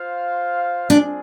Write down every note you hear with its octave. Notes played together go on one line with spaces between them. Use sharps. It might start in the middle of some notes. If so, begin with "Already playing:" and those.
Already playing: F4 C5 F5
C4 D4 F4 G#4